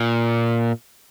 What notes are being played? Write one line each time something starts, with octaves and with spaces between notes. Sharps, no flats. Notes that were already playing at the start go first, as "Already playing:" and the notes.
Already playing: A#2